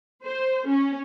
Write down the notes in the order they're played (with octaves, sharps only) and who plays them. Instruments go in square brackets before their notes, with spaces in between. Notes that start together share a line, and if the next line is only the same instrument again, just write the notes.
[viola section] C5
C#4